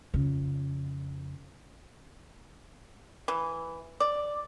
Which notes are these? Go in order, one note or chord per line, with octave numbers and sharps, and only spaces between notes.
F2 C#3
E3
D5